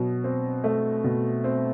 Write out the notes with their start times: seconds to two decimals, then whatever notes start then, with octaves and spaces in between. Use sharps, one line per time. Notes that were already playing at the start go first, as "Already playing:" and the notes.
Already playing: B2 F#3
0.24 C4
0.64 A3
1.04 B2
1.44 C4